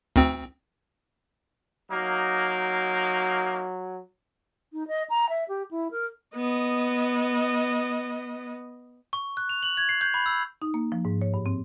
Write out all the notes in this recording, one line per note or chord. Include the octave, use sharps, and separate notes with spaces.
D2 C4
F#3 A#3 D#4
D#4
D#5
A#5
E5
G4
E4
A#4
B3 D#5
C#6
F#6
F7
F#7
G#6
C7
G6
B5
E6
D#4
A#3
F3
G#2
C#5
G2
C4